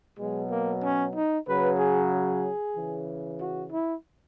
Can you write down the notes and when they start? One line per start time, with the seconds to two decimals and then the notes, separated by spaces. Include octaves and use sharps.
0.18 B2 F#3 G#3
0.50 A#3
0.83 C#4
1.15 D#4
1.47 C#3 F#3 B4
1.78 G#4
2.12 G#4
2.75 C#3 E3
3.40 F#4
3.72 E4